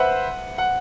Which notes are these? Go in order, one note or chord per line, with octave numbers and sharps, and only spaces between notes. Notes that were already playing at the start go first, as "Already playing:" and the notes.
Already playing: B4 C5 E5 F#5
F#5